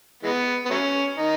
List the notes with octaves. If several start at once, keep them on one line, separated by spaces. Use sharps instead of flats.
E3 G#3 B3
B3
F#3 A3 C#4
D#3 D#4